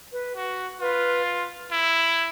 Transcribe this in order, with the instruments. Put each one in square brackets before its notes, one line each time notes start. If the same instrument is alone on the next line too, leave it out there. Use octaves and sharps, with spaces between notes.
[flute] B4
[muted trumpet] F#4
[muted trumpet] F4 [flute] B4
[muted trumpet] E4